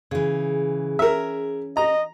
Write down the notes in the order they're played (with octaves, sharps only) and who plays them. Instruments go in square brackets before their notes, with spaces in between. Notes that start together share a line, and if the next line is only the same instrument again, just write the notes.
[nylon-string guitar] C#3 E3 [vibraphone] G#4
[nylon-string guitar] C#4 [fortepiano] A#4 E5
[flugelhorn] D#5 [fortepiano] A#5